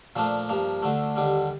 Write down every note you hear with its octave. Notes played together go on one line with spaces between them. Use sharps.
A#2 F3 A3 D4 F4
G2 F3 A#3
D2 D3 A3
D#2 D3 G3